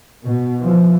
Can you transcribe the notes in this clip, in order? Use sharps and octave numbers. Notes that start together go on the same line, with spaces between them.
B2
E3 F3